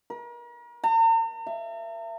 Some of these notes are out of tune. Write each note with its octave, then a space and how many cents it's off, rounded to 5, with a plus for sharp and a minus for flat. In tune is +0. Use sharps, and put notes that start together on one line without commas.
A#4 +40
A#5 -45
E5 +35